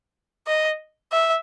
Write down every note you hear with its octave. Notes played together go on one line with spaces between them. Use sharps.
D#5
E5